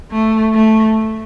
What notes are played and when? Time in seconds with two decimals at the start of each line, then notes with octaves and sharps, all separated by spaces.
0.11 A3
0.53 A3